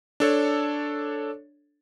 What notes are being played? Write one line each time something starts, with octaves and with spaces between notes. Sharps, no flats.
D4 A4 C#5